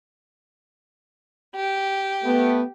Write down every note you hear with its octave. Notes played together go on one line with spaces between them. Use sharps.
G4
A3 B3